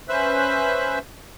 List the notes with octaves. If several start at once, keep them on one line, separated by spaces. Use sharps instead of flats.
C#4 B4 C5 E5 E6 F#6